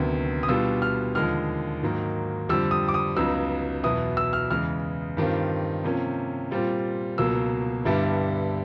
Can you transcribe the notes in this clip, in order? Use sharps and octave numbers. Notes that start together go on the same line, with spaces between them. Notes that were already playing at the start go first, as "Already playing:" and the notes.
Already playing: D2 C3 D#3 F#3 B3
D#6
B2 G3 B3 D4 F4 E6
F6
D#2 D3 F3 G#3 F6
G#2 D#3 F#3 A#3
F2 D3 G3 C4 E6
D#6
D6
D#6
C#2 C#3 F#3 B3 D#4 E6
E2 B2 F#3 B3 E4 D#6
E6
F6
E2 C#3 E3 G#3 F6
G2 D#3 G3 C4 F4
C3 F3 A#3 C#4
A#2 G3 C4 F4
C#2 B2 F#3 A#3 E6
G2 D3 G3 B3 E4